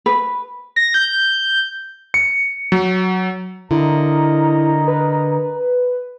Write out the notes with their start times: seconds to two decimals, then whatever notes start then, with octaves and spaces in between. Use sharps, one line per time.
0.06 B4
0.76 A#6
0.94 G6
2.14 C#7
2.72 F#3
3.71 D3 E4 A#4 D#5 A#5
4.88 B4